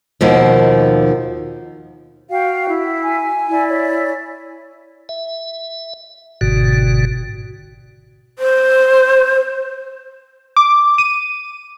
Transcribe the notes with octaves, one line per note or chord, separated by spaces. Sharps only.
D#2 B2 D#3 F3
F#4 F5 G5
E4
G#5
E4 D5
C#5
E5
G1 G#2 B2 D3 F#4
C5
D6
D#7